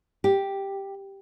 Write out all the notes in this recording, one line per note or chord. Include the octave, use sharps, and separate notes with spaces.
G4